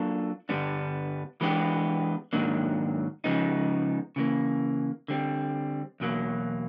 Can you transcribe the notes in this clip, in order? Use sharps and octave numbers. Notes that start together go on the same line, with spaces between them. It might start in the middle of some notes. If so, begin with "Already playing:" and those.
Already playing: F#3 A#3 D4 F4 A4
G2 D3 G3 B3 D4
E3 G#3 B3 D4 G4
G#2 D#3 F#3 A#3 D4
C#3 F3 G#3 B3 D#4
C#3 E3 G3 A#3
D3 G3 C4
E2 B2 F#3 A#3